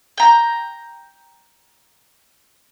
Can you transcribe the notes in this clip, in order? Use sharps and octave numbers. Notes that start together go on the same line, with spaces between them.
G5 A#5